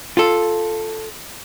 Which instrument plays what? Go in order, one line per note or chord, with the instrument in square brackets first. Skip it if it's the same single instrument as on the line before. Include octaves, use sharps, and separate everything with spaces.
[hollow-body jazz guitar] F4 A4